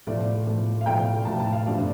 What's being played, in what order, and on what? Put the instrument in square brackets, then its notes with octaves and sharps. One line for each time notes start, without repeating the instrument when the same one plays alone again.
[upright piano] A2 F3 A3 D5
A2 F3 A3
F5
A2 F3 A3 G5
A2 F3 A3 A5
A5
F5
G2 F3 A3 D5